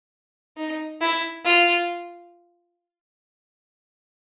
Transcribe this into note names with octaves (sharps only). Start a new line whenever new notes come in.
D#4
E4
F4